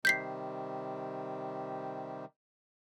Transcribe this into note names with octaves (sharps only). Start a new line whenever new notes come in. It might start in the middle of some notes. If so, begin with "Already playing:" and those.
C3 D#3 G3 G6 B6 C7